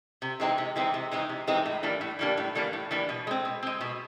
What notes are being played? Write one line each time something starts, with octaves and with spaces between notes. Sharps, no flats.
C3
E3 G#3 C4 D#4
C3
E3 G#3 C4 D#4
C3
E3 G#3 C4 D#4
C3
E3 G#3 C4 D#4
A2
E3 G3 A#3 D4
A2
E3 G3 A#3 D4
A2
E3 G3 A#3 D4
A2
E3 G3 A#3 D4
B2
G#3 C4
B2
G#3 C4
B2